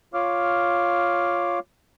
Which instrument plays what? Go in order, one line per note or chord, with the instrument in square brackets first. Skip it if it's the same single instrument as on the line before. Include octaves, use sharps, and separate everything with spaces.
[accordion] F4 C#5 F5 D6 F6